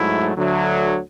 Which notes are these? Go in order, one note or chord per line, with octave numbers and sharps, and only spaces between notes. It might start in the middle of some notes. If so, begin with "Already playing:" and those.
Already playing: G#2 F#3 A3 E4
D2 D3 F#3 A3